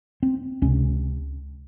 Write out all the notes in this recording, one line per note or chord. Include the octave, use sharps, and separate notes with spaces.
C4
C#2 C3 C#4